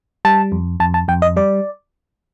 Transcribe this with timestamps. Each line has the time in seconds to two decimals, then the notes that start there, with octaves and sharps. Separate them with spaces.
0.25 G3 A5
0.52 F2
0.80 F2 A5
0.94 A5
1.08 F2 G5
1.22 D#5
1.36 G3 D5